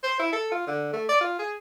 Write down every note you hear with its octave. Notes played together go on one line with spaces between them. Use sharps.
C5
E4
A4
F4
D3
A3
D5
F4
G#4